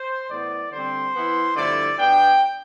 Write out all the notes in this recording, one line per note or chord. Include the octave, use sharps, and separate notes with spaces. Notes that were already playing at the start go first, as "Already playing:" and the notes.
Already playing: C5
A2 E3 B3 D5
D3 G3 C4 C5
E3 B3 E4
G2 D3 F3 A3 E4 D5
B2 B3 D4 G5